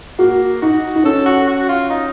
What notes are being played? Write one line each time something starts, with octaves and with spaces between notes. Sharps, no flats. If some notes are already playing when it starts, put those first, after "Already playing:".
A#3 F#4
D#4 F#4
D#4
C#4 A4
F#4
F#4
F4
D#4